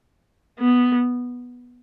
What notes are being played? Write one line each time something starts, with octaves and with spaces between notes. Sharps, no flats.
B3